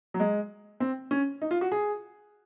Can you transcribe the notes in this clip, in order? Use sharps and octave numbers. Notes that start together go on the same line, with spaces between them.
F#3
G#3
C4
C#4
D#4
F4
F#4
G#4